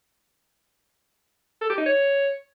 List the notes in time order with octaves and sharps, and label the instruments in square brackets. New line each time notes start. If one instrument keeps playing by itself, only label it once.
[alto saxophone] A4
G4
D#4
C#5